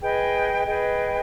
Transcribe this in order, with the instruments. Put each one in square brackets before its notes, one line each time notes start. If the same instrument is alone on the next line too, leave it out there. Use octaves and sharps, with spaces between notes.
[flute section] G#4 B4 D#5 G5
G#4 B4 D#5 G5